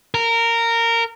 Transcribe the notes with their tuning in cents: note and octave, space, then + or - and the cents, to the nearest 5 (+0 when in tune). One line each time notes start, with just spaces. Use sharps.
A#4 -15